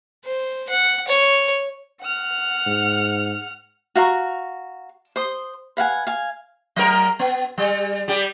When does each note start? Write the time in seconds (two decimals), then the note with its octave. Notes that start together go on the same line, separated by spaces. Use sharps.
0.25 C5
0.69 F#5
1.08 C#5
2.01 F#5 F6
2.67 G#2
3.96 F#4 F5 A#5 C#6
5.16 C5 C6 D#6
5.77 B4 F5 F#5 G#5
6.07 F5 G#5
6.76 F#3 A#4
7.19 B3
7.58 G3
8.08 G3 G4